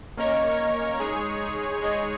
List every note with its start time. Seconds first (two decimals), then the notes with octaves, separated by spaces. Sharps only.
0.17 A#3 C#4 A#4 C#5 D#5
1.00 G#3 D#4 G#4 C#5
1.82 G#3 D#4 G#4 C#5 D#5